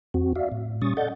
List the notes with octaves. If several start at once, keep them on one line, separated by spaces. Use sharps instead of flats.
F2 C4 F#4
F#4 D5 E5 F5
A2
A#2 G3 C#4 C#6 D#6 A6
A4 D5 D#5 F#5 G6 A6